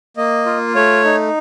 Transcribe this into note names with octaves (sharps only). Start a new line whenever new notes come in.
A#3 D#5
F4
A3 C#5
D#4